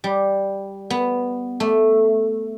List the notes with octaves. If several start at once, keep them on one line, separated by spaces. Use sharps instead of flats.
G3
B3
A3